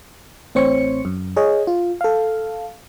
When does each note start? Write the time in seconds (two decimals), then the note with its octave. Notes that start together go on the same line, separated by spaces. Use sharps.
0.55 A1 A2 C4 C5 C#5 C#7
1.05 F#2
1.37 G#4 C#5 D#5
1.67 F4
2.01 A4 F5